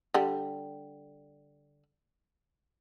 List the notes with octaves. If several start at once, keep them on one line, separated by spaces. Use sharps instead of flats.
D3 G3